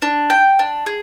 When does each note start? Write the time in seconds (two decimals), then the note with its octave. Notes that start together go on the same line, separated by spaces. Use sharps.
0.02 D4
0.30 G5
0.59 D4
0.86 G#4